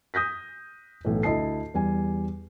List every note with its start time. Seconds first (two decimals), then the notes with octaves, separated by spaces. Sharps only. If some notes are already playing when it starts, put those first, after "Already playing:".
0.14 D#6 G6 A#6 B6
1.05 B1 A2 E3
1.23 D2 E4 D#5 A5 C7
1.74 E2 G3 G#5